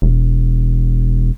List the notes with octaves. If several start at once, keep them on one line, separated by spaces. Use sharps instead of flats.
E1